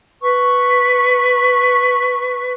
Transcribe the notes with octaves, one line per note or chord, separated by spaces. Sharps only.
B4 C#6